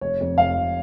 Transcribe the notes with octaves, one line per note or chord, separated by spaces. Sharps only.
F1 C#5
F2
F1 F5
F1